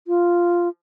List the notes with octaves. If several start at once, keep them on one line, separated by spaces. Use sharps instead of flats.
F4